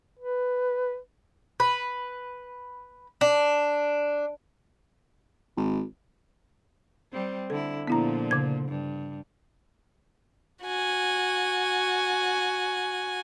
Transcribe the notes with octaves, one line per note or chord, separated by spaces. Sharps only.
B4
B4
D4
G#1
G3 C4
D3 E4 A4
A#2 D3 F3 B3 E4 A#5
C#3 G#6
G2
F#4 G#5